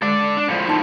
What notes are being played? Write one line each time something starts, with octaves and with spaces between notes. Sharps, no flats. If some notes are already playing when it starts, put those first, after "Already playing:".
G#3 A4 D5
D4
A2 F3
D#4 A5